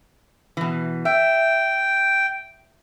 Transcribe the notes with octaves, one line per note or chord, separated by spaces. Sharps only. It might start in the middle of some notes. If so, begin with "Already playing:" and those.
B2 E3
E5 G5